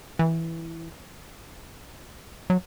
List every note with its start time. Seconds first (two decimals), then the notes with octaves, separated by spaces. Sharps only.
0.19 E3
2.50 F#3